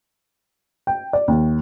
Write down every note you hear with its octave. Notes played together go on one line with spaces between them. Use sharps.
G5
D5
D#2